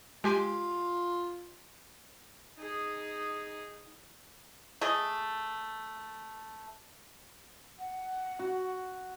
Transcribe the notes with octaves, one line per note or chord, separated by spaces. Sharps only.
G#3 F4 G4 G#5
D#4 G#4
A3 G#4 D#5
F#5
F#4